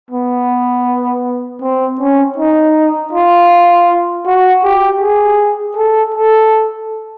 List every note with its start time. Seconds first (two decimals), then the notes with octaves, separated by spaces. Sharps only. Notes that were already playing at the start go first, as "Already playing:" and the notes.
0.11 B3
1.62 C4
2.00 C#4
2.38 D#4
3.13 F4
4.26 F#4
4.64 G4
5.01 G#4
5.77 A4
6.15 A4